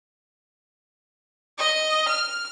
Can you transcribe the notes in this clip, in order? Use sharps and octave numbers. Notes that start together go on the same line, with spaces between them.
D#5
F6